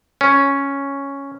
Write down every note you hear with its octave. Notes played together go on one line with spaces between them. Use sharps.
C#4